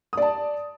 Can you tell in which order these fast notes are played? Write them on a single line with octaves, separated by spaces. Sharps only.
D#6 D5 A5